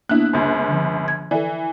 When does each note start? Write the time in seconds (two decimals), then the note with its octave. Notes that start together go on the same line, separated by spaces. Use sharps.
0.09 B2 A#3 D4 E4 F#6
0.33 G1 C#2
0.68 D3 F3
1.08 G#6
1.31 E3 A4 D5